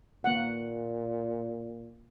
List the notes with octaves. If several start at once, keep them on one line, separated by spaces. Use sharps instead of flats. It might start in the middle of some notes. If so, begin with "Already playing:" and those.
A#2 A#3 F#5